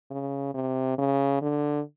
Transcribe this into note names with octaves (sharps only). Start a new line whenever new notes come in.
C#3
C3
C#3
D3